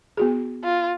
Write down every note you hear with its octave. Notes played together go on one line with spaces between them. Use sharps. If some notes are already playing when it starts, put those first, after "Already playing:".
B3 F#4 G#4
F4